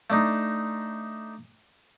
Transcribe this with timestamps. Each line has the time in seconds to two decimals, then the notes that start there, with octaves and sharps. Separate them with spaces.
0.10 A3 D4 D#4